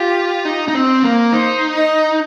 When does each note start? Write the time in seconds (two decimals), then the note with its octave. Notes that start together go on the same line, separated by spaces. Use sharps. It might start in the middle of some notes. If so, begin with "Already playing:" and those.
Already playing: F4 G4
0.45 D#4
0.68 D#4
0.75 C4
1.03 A#3
1.32 D#4 C5
1.75 D#5